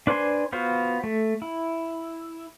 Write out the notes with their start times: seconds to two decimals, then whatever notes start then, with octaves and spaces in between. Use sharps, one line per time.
0.07 D4 B4 C5 G#5 C6
0.53 B3 F4 F#4 C5
1.04 A3
1.42 E4